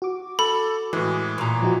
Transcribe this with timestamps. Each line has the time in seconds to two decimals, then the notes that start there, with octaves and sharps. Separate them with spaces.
0.02 F#4 D6
0.39 A4 B5
0.93 A2 E3 G#3
1.38 A#2 A#5
1.62 F3 D#4 F#4